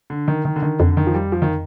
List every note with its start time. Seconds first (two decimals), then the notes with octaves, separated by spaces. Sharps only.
0.10 D3
0.28 D#3
0.45 D#3
0.56 D3
0.62 D#3
0.80 F2 D3
0.91 D3
0.97 D#3
1.07 F3
1.14 G3
1.32 F3
1.42 D#3